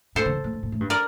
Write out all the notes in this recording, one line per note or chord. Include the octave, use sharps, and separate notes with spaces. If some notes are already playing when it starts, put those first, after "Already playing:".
A#2 A4 C5
D3
C3
A#2
A2
A#2
A2
G2
A#4 D5